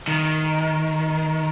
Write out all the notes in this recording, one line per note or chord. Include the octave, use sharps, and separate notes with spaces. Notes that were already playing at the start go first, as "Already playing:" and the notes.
D#3